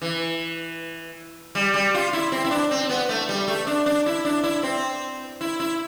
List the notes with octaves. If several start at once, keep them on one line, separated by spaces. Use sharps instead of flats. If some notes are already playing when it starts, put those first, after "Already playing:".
E3
G3
G3
F4
E4
C4
E4
D4
C4
B3
A3
G3
A3
D4
D4
E4
D4
E4
C4
E4
E4